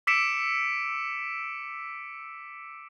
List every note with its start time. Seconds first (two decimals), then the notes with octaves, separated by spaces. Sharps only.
0.07 D6 E6 B6 C#7 D7 E7